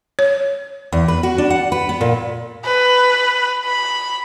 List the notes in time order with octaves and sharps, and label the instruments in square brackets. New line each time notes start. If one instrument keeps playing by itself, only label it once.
[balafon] C#5
[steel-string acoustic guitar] E2
B4
F#4
D4
F#5
B4
B3
A#2
[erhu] B4
B5